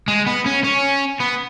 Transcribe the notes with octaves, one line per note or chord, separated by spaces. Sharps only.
G#3
B3
C#4
C#4
B3